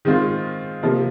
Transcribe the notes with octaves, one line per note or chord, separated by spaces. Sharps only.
D#3 G#3 C4 F4 C5
C3 F3 A#3